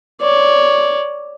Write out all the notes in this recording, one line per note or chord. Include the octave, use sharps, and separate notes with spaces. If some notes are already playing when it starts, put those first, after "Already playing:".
C#5 D5